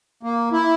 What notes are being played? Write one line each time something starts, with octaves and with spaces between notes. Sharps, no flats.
A#3
E4